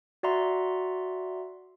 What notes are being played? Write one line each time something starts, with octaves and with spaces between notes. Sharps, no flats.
F#4 D5 E5 F#5 A#5 C6